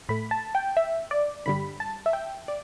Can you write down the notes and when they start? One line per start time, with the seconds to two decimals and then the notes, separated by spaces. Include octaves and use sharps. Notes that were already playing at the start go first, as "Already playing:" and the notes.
0.09 A2 A3 B5
0.31 A5
0.55 G5
0.77 E5
1.11 D5
1.46 G2 D3 G3 B5
1.80 A5
2.06 E5
2.13 G5
2.48 D5